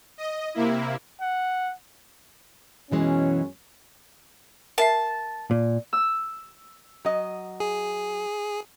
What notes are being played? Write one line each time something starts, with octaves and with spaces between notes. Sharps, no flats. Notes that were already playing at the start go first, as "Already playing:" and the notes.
D#5
C3 A#3 E4
F#5
F#2 B2 E3 F#3 G#3 C#4
A#4 E5 A5 C7
A#2
E6
F#3 D#5
G#4